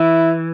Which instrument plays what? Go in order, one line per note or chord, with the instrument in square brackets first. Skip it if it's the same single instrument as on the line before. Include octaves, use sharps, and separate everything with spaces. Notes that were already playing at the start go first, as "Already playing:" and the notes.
Already playing: [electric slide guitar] E3 [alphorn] E4